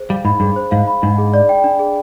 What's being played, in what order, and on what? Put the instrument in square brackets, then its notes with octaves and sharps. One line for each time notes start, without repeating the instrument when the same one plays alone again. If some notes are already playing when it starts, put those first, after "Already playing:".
Already playing: [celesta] G#4 C5
[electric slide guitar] G3 [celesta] F5
[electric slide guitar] G#2 [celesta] B5
[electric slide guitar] G2 [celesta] G#4
[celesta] C5
[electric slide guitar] G#2 [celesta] F5
[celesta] B5
[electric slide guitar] G#2 [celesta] D4
[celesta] G#4
D5
G5
D4
G#4